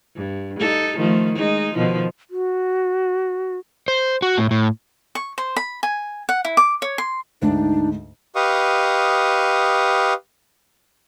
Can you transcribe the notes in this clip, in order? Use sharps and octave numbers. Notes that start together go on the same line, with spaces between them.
G2
D#4 A4
D#3 F3 A3
G#3 D#4
B2 D#3 F3
F#4
C5
F#4
A2
A2
C#6
C5
B5
G#5
F#5
E4
D6
C#5
C6
D2 G#2 D4 D#4
G4 B4 D#5 F5 C#6 D#6